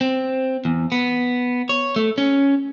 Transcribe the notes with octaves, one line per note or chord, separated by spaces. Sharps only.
C4
E2
B3
C#5
A3
C#4